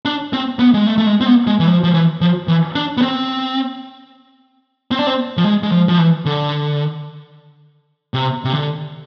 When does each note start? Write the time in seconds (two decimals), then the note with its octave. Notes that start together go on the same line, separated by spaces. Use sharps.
0.05 D4
0.33 C4
0.59 B3
0.74 G#3
0.87 A3
0.98 A3
1.06 G#3
1.21 C4
1.26 B3
1.47 G#3
1.59 E3
1.67 F3
1.84 F3
1.94 E3
2.21 F3
2.48 E3
2.75 D4
2.97 B3
3.01 C4
4.91 C4
4.99 D4
5.07 C4
5.37 F3
5.44 G#3
5.63 G#3
5.72 F3
5.88 F3
5.98 E3
6.26 D3
8.14 C3
8.45 C3
8.54 D3